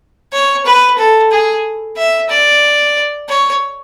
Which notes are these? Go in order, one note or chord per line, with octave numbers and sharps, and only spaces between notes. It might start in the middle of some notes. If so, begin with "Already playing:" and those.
C#5
B4
A4
G#4
E5
D5
C#5